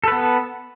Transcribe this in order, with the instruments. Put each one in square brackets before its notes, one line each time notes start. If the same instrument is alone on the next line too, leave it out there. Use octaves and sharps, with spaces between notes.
[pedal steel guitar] A4
B4
B3